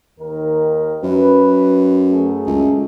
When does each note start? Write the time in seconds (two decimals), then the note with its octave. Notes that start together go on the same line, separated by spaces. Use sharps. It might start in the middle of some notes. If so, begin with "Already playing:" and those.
0.20 D#2 D#3 A#4
1.03 F#2 B4
2.11 F#3 A3 G#4
2.47 C#2